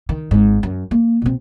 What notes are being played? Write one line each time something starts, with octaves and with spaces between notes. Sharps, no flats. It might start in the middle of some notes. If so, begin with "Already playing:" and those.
D#3
G#1 G#2
F#2
A#3
B2 C4